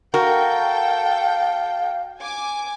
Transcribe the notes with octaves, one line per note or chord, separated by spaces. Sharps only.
F#4 A4 A#4 F5 G5
G#5 D6